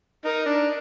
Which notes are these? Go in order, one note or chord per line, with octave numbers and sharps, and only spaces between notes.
D#4 A#4
D4